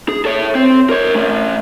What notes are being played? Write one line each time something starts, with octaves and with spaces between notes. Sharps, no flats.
G#4
A4 C#5
C4
A#4 C#5
A3 C#4